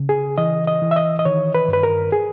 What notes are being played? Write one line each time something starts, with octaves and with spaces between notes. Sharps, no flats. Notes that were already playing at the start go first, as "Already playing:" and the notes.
Already playing: C#3
G#4
E3 D#5
D#5
E3
E5
D#5
D#5
D#3 C#5
B4
G2
B4
A#4
G#4